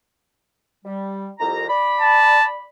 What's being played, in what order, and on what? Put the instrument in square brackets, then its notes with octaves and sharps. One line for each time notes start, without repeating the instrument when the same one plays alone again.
[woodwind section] G3
C2 F2 A#5
D5 B5
[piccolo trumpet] A5